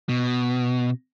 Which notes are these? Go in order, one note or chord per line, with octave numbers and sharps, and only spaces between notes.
B2